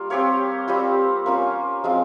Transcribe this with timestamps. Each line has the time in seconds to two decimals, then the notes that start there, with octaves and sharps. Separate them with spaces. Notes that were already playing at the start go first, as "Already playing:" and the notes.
Already playing: G3 A#3 F4
0.10 C4 G4 C#5 F5
0.68 G3 C4 F4
1.26 A#3 C#4 F4
1.84 F3 G#3 C4 F4